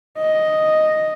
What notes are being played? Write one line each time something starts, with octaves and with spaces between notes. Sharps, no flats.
D#5